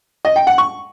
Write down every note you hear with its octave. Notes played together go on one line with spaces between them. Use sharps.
D#5
G5
F#5
C#6